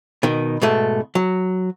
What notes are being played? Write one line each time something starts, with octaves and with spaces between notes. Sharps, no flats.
B2 D#3
G#2 B2 A3
F#3